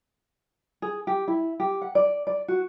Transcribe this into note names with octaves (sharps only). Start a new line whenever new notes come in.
G#4
G4
E4
G4
F#5
D5
D5
F#4